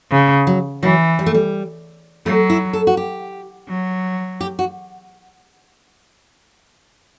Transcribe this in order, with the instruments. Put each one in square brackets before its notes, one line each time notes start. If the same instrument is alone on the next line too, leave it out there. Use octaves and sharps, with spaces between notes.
[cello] C#3
[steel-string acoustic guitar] F#3
[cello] E3 [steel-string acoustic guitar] F#3
[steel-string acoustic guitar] G3
A3
G3
[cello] F#3 [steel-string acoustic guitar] A3
[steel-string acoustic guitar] E4
A4
F#4
G4
[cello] F#3
[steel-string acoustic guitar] G4
F#4